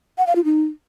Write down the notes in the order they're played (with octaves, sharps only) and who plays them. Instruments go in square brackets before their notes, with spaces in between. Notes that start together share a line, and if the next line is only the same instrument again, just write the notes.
[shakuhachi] F#5
F5
F4
D#4